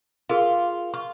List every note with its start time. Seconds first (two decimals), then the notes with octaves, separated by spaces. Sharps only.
0.29 F4 G#4 A#4 F5
0.94 F4 C#6